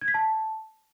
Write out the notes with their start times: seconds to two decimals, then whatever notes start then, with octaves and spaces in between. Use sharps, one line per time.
0.01 G#6
0.08 B6
0.14 A5